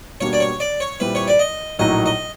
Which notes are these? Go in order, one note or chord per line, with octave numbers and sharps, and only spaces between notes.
B2 G3 A#3 D4 F#4 C#5
D5
C#5
D5
C#5
A#2 G3 C4 E4 B4
C#5
D5
D#5
A#1 A2 F#3 A#3 D#4 D#5
D#5